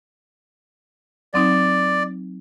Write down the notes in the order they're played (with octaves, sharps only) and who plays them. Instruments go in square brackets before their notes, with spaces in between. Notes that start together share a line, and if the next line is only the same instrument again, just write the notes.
[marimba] F#3 C4 D#4 [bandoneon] D5